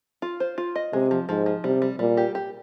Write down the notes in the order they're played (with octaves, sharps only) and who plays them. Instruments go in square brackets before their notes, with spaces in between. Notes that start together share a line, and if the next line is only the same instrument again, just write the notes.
[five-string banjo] F4
C5
F4
D#5
[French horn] C3 [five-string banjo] G#3
[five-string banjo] F3
[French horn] G#2 [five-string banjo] F3
[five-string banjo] F3
[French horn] C3 [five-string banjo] G3
[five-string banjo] G3
[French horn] A#2 [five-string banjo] G3
[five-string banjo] G4
G4